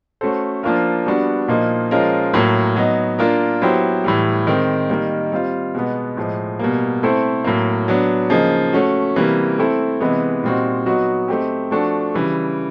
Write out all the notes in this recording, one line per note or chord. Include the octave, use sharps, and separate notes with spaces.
A3 C#4 F#4 A4 C5
F3 A#3 D4 F4 A#4
G3 B3 D4 F#4
A#2 F3 A#3 D#4
F3 G#3 C#4 F4 A#4
A2 F#3 A#3
F#3 B3 D#4
A#3 D4 F4 A#4
F#3 B3 E4 G4 C5
A2 E3 G3
D#3 G#3 C4 D#4
D#3 G3 A#3
G3 C4 F4
B2 G#3 B3
A2 F3 G#3
B2 G3 A#3
A3 C4 E4 A4 C5
A2 F#3 A#3
F#3 B3 D4
C#3 F3 A#3 D#4 G#4
A3 C#4 F#4
C3 E3 G3 A#3
A3 C4 E4 A4
C3 E3 G#3 B3
A#2 G3 C4 D#4 F#4
F#3 B3 D#4 F#4
A3 C4 D#4 G4
F3 A3 D4 F#4 A4
C#3 E3 G3